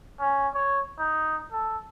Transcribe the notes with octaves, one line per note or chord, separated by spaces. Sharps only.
C#4
C#5
D#4
A4